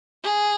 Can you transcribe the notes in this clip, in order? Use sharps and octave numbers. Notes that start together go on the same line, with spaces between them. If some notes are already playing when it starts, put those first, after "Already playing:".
G#4